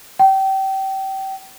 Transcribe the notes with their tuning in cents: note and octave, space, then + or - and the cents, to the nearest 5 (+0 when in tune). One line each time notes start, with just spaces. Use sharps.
G5 -25